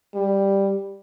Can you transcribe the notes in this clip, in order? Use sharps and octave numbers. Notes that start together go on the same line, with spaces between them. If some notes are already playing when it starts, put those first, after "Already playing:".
G3